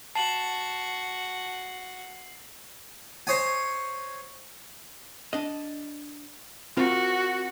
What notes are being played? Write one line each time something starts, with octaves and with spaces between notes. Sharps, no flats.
F#4 A5 C7 F#7
C5 C#5 D#5 G#5
D4 D#5
C4 F4 F#4 A#4